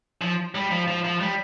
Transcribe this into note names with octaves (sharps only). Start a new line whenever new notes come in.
F3
G3
F3
F3
F3
G3